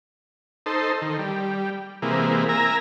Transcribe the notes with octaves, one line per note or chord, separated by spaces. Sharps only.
D#4 A4 C5
D#3
G3
C3 E3 G#3 A#3
A#4 E5 G#5 A#5